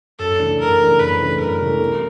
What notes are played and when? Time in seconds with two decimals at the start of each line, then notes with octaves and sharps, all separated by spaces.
0.19 F#2 A4
0.39 C#3 E3 A3 D4
0.59 F#2 A#4
0.80 C#3 E3 A3 D4
0.99 F#2 B4
1.19 C#3 E3 A3 D4
1.39 F#2 A#4
1.60 C#3 E3 A3 D4
1.80 C3